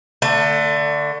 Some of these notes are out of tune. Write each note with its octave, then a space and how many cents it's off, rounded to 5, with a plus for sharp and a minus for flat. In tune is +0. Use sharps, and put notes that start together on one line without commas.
D3 +0 A3 +25